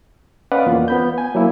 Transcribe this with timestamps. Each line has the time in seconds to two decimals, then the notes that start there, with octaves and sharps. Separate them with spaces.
0.52 C#4 B4 D5 D#5 F5 F#5
0.66 E2 A#3 F4
0.88 B3 B5 G6
1.18 G#5
1.35 F#3 A#3 E4